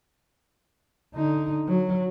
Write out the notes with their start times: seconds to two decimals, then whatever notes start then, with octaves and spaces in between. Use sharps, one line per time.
1.16 D3 D#4
1.68 F#3